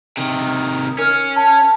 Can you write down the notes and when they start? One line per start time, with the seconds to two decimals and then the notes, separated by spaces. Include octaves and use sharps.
0.17 C3 D#3
0.99 C#4 A#4 F6
1.36 A5